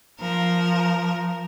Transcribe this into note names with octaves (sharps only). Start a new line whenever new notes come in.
F3 A#4